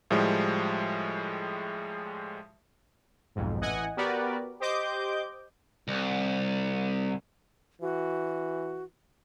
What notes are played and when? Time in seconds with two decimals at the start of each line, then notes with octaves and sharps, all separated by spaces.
0.11 A2 F3 G3 G#3
3.35 B1 F2 G#2
3.60 A1 E3 D#5 F#5 G#5
3.97 B3 F#4 G4 A#4 B4 D5
4.60 G4 C5 D#5 D6 G6
5.88 C2
7.81 E3 F#4